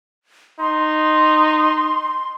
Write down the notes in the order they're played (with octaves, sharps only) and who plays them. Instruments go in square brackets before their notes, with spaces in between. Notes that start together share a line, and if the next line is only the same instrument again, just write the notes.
[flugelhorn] D#4 [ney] C6